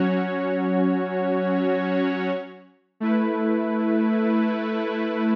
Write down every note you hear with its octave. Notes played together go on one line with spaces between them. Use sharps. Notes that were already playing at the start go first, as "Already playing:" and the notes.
Already playing: F#3 C#4 F#4 C#5
A3 E4 B4